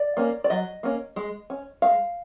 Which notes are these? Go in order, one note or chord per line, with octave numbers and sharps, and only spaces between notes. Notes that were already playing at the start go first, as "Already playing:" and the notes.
Already playing: D5
A#3 C#4
D5
F#3 D#5
A#3 C#4
G#3
C#4
G#3 F5